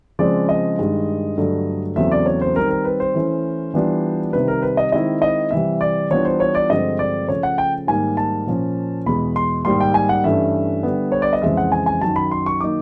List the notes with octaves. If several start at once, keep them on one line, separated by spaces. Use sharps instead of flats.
C#3 F3 G#3 C4 D5
D#5
G2 D#3 G#3
G2 D3 F#3 A3
E2 C#3 F#3 A3 C4 E5
D5
C#5
C5
D#3 G3 C4 A#4
A#4
B4
C5
E3 A3 C#4 E4
E3 G3 B3 D4 F4
C3 D#3 G3 B4
A#4
B4
D#5
D#3 G#3 C4 E4 D#5
D#5
C3 E3 G3 E5
D5
E3 G3 B3 D4 F4 C#5
C5
C#5
D5
G2 D3 F3 G#3 C4 D#5
D5
C#3 F3 A3 C#5
F#5
G5
G#2 D#3 G3 A#3 G#5
A5
A#2 F3 A#3 C#4
E2 B2 G#3 B5
C6
G#2 D#3 G3 A#3 C6
G5
G#5
F#5
G2 E3 A3 C#4 E5
D3 G3 B3
C#5
D5
D#5
F2 C#3 E3 G#3 E5
F#5
G#5
G#5
F#2 D#3 F#3 A5
B5
C6
C#6
D#3 F#3 A#3 D#4 D6